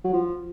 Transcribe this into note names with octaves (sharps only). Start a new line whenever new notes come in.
F#3
F3